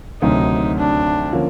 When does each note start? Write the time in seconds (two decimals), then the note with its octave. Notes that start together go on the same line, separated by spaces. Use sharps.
0.21 D2 C3 D#3 F#3 D#4
0.77 D4
1.33 D3 F3 A#3 C#4